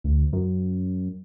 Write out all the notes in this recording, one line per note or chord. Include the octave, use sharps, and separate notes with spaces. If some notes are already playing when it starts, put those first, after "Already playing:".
D2
F#2